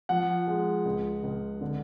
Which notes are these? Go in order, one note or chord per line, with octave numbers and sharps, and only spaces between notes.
F3 F#5
G#3
C#2
C#2
D3